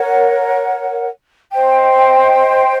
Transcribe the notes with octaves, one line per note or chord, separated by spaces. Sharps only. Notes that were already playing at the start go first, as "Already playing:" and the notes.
Already playing: A#4 C#5 F#5
C5 D#5 G5